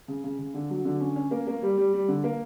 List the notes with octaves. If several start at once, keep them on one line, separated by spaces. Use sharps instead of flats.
C#3
C#3
C#3
D3
F#3
D3
C#4
C#4
A#3
A#3
G3
G3
G3
D3
A#3